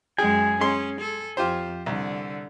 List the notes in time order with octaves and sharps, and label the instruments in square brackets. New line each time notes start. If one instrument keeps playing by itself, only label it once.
[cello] F#2 G#3 [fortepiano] G#4 G5 [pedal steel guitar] G#5
[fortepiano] G#3 C6 [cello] C#4
[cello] A4
[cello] F2 [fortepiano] F4 G4 C5
[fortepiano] C2 [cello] D3